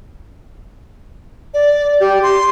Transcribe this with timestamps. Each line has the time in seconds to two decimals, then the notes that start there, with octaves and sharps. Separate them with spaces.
1.54 D5
2.00 G4
2.23 C6